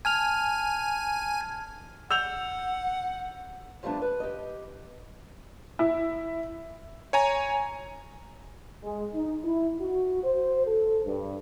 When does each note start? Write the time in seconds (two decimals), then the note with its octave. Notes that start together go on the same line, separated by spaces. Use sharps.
0.05 G#5 A5 F6 F7
2.11 F#5 E6 G6 F7
3.83 F3 G3 A3 B3 D4
4.02 B4
4.20 G4 D#5
5.79 E4
7.13 C#5 G#5 A#5
8.83 G#3
9.14 D#4
9.45 E4
9.80 F#4
10.24 C5
10.66 A4
11.05 G2